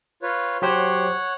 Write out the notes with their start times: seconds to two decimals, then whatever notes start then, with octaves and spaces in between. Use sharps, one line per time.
0.22 F4 B4 C#5
0.62 F#3 G4 C5 C#5 F#5